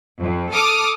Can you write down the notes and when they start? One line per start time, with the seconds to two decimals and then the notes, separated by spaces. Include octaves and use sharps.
0.19 F2
0.52 A4 D6 D#6 F6